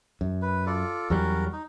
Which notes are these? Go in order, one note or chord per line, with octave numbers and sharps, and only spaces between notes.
F#2
B4
F4 A4 D5
E2 F#3 G3 C#4 F#4 A#4
D#4